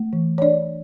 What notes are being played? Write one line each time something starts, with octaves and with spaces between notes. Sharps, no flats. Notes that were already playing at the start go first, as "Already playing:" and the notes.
Already playing: A3
E3
C#5
D4 D5